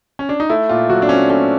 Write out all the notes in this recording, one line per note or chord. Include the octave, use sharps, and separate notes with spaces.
C#4
D4
D#4
A3 E4
A#2 F4
F#3 F#4
D4
C4 C#4
A3 C#4